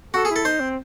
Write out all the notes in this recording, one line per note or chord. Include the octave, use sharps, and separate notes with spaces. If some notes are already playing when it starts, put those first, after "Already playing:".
F#4 A4
G#4
E4
A4
D#4 C5
C4